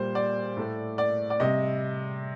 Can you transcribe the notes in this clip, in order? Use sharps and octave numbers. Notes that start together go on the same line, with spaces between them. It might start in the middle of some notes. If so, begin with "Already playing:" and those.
Already playing: A#2 G3 C5
D5
A2 A3
D5
D5
C3 G3 D#5